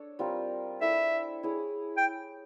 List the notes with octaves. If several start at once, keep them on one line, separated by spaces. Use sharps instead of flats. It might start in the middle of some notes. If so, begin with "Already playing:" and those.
Already playing: D4 A4 C#5
G3 C4 F4 A#4
E4 A4 D5 E5
E4 G#4 C#5
G5